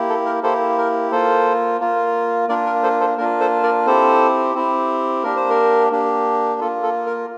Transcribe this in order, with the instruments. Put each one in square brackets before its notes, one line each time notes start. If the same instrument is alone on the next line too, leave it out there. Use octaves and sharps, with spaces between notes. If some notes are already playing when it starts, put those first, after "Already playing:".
Already playing: [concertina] A#3 E4 G4
A4
A#4
A#3 E4 G4 A4 C5
A#4
A#3 F4 A4 C5
A#3 F4
A#3 D4 F4 A#4 D5
A#4
A4 C5
A4 C5
A#3 D4 F4 A#4
A4 C5
A#4 D5
C4 E4 G4 A4 C5
C4 E4 G4
A#3 D4 G4 A#4
C5
A#4
A#3 D4 G4
A#3 F4 A4
A4
A#4